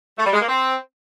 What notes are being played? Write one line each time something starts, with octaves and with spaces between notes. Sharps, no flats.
A3
G3
G#3
A#3
C4